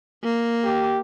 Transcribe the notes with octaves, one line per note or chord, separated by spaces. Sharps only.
A#3
G4